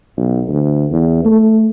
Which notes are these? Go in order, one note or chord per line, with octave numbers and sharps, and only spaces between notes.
B1
D2
E2
A3